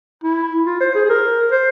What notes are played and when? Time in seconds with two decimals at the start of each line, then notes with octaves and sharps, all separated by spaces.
0.23 E4
0.66 F4
0.80 C5
0.95 G#4
1.05 G#4
1.09 A#4
1.51 C5